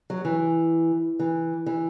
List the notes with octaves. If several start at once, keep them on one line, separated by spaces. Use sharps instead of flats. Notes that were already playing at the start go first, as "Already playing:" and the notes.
F#3
E3
E3
E3